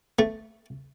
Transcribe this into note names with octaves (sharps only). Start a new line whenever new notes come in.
A3